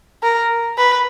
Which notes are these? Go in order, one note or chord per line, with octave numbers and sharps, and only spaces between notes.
A#4
B4